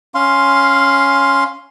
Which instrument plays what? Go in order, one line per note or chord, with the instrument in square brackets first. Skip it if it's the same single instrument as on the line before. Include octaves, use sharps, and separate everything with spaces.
[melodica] C#4 F5 C6